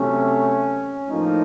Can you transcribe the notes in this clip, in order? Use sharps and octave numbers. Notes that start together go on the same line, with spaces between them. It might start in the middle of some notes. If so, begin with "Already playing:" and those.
Already playing: C3 F#3 A3 C#4
A2 F3 A#3 D#4